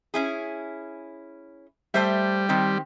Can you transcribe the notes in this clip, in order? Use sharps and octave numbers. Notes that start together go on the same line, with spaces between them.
C#4 E4 G#4
G3 A3 C5 E5
D#3 C4 G4